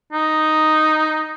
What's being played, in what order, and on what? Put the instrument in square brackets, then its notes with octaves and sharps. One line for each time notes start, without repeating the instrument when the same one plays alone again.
[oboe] D#4